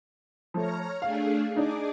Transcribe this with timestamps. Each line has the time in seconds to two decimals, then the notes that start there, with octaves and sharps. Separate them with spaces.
0.54 F3 A3 C#5 A#5 F6
1.02 A3 D4 G#4 F5
1.56 D4 D#4 G#4 D6